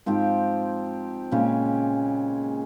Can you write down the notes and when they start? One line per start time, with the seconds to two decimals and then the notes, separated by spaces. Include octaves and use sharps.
0.06 G#2 F3 C4 G4
1.31 A#2 C#3 G#3 C#4 G4